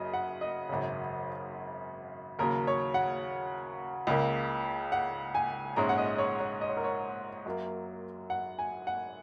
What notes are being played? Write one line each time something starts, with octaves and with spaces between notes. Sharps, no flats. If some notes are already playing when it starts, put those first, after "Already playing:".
Already playing: F#1 F#2 C#3 F#3 D#5
F#5
D#5
G#1 F#2 C#3
D#2 C#3 F#3 A#4
C#5
F#5
C#2 C#3 A#3
F#5
G#5
A#1 G#2 G#3 C#4 A#5
F#5
D#5
C#5
C#5
D#5
C#5
A#4
C#5
F#2 F#3 A#3
F#5
G#5
F#5